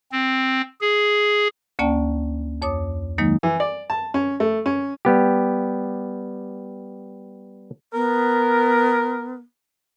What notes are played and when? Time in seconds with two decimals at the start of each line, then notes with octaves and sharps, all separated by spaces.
0.12 C4
0.81 G#4
1.79 D2 A#3 C#4 D5 G5 A5
2.62 F2 C#5 D6 D#6
3.18 D#3 F#3 G#3 A#3 D#4
3.43 E3
3.60 D5
3.90 A5
4.14 C#4
4.40 A3
4.66 C#4
5.05 G3 B3 G4
7.93 B3 A#4